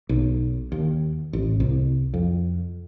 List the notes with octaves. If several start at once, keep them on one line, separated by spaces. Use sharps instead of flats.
B1
D#2
A1
C2
F2